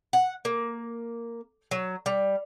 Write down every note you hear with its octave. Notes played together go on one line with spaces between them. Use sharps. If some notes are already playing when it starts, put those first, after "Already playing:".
F#5
A#3
F#3
G3